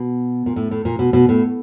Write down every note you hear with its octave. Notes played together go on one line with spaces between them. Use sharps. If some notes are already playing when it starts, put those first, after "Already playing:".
Already playing: B2
A#2
A2
A2
A#2
B2
B2
A2